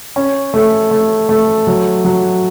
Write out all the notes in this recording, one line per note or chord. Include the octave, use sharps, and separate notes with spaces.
C#4
A3
A3
A3
F#3
F#3